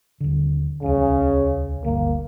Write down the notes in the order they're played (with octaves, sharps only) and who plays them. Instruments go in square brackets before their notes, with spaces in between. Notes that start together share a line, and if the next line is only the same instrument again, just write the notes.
[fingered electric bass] D#1 D3
[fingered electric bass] D#1 C#2 [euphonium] C#3
[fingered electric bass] G1 D2 [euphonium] A#3